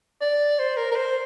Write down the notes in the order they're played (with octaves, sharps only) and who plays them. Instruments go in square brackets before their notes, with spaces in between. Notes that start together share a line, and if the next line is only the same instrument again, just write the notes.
[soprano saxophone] D5
C5
A#4
A#4
C5